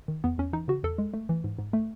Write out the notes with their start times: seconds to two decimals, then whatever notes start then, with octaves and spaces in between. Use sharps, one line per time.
0.08 D#3
0.24 E2 B3
0.38 E2 C#4
0.53 E3 D#4
0.68 C#3 F#4
0.83 E2 A4
0.98 G#3
1.14 A3
1.29 E3
1.44 G#2
1.58 G#2
1.73 A3